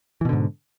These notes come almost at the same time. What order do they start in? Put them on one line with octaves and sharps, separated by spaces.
E3 B2 D3 G#2